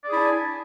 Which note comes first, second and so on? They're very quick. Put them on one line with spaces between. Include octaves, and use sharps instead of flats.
D5 G#4 E4 D4 G#5